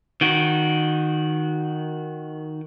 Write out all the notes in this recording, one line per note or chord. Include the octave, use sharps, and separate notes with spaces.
D#3 F#4